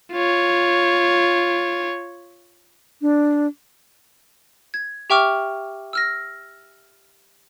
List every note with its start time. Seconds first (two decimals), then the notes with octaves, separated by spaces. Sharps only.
0.12 F4 C#5
3.02 D4
4.74 G#6
5.10 G4 E5 G5 C#6 D6 F6
5.93 E6 F6 A#6